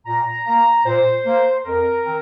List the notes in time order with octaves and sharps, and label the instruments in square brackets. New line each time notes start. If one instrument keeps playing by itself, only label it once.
[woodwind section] A#2 A#5
A#3 A#5
A#2 C5
A#3
F2 A#4
D#3 C4